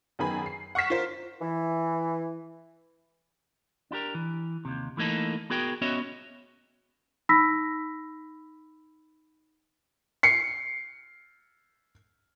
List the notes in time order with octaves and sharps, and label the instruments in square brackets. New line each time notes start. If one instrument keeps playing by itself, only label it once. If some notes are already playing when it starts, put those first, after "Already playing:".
[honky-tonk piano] F#2 D#3 B3 G#4 G#5 B5
C7
F#5 C#6 F6 B6 E7
F4 A#4 C5
[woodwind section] E3
[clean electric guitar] D4 E4 G4 A#4
E3
D#2 C3
E3 A3 A#3 D#4 A4
B3 F#4 G#4 A#4 G5
B3 C#4 F#4 C#5 D#5 E5
[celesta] D#4 B5 E6 A#6 B6
[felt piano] C7 C#7